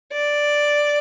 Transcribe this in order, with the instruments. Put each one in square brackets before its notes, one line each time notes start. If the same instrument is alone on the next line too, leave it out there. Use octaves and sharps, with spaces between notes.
[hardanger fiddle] D5